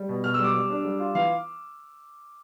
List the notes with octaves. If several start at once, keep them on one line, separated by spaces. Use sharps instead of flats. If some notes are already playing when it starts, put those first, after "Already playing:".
Already playing: G3
B2
B2 F6
E6
G3 D6
G3
D4
G3
F4
E3 F5